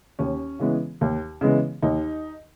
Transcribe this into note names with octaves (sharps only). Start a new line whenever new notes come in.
D#2 C#4
C#3 E3 G#3 B3
D#2
C#3 E3 G#3 B3
D#2 D#4